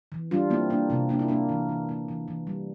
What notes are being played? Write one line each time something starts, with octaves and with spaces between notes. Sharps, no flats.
E3
G3 D4 F4
A#3 C4 E4
A#3 D4
C3 C4
A#3 D4
E4
A#3 D4
E3
E3
A#3
E3
E3
G3